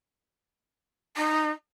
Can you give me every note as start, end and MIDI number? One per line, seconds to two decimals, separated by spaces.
1.17 1.50 63